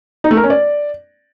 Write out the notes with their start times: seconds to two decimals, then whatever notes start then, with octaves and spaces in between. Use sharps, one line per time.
0.24 D#4
0.31 A3
0.37 A#4
0.44 C#4
0.50 D5